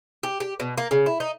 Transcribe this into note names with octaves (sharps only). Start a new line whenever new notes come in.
G4
G4
B2
A#3
C#3
E4
D#4